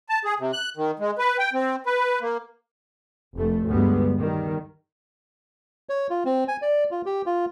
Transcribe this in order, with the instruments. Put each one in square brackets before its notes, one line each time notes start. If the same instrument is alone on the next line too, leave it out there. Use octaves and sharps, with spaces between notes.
[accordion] A5
G#4
C3
F#6
D#3
G#3
B4
G5
C4
B4
A#3
[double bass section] F1 A3
D2 G2 G3 G#3 B3
D#3 G3
[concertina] C#5
F4
C4
G#5
D5
F4
G4
F4